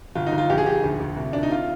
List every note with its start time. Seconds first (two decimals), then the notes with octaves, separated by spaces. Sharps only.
0.15 G1 F4
0.27 D#4
0.32 G1
0.38 F4
0.50 A#1 G4
0.58 G#4
0.66 A#1 G4
0.84 D2
1.00 D2
1.17 C2
1.33 C2 D4
1.43 D#4
1.51 F4